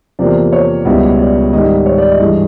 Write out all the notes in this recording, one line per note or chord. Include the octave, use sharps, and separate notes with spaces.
E2 C3 F3 A#3 D5
C#5
C#2 B2 G3 B3 E4
D5
G#2 D#3 G3 D#5
C#5
D5
D#5
G2 E3 G#3